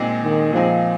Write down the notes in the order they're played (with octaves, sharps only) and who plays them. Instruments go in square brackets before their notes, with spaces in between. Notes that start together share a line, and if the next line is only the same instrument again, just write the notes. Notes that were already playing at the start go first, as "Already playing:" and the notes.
Already playing: [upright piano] A#2 G#3 C4 D#4 G#4
[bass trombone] D#3
[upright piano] A#2 G#3 C4 D#4 G#4 [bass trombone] F3